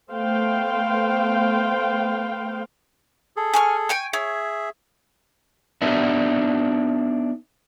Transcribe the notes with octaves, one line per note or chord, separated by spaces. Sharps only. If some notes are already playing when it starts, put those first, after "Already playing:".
A3 B3 C5 F5 G5
G#4 A4
G#5 C#6 F6
G5 G#5 C#6
G#4 C#5 E5
B3 D4 D#4 E5